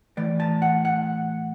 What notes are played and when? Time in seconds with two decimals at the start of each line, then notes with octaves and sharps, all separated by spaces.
0.17 A2 E3 D5
0.40 A5
0.62 F#5
0.85 F#5